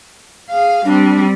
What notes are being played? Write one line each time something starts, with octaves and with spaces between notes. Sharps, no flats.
G#4 F5
G3 C4 D4